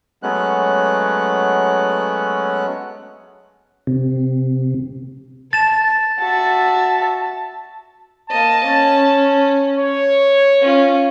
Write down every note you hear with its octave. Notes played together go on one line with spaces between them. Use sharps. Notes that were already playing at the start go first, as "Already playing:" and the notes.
F#3 G#3 A3 B3 C#4 F#6
C3
A5 A6 E7
F#4 E5 A5
A#3 D#5 A5
C#4
C#5
C#4 F4